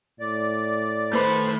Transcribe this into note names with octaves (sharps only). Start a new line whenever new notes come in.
A2 D5
D#3 A3 B4 C5 B5